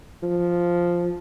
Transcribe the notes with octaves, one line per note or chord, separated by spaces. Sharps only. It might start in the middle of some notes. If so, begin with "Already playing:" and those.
F3